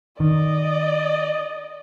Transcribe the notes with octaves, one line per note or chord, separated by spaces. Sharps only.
D#3 D5 D#5